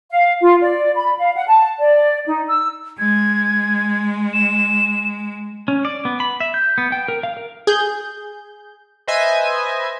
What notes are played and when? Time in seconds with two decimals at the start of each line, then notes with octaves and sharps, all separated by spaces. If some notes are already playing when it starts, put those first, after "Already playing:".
0.10 F5
0.42 F4
0.62 D5
0.95 B5
1.18 F5
1.35 F#5
1.48 A5
1.78 D5
2.26 D#4
2.48 E6
2.99 G#3 G#6
4.33 E7
5.68 C#4
5.85 D5
6.05 B3
6.20 B5
6.40 E5
6.54 G6
6.78 B3
6.92 G5
7.08 A#4
7.23 F5
7.37 A#4
7.67 G#4 G6
9.07 B4 C5 D#5 E5 G#5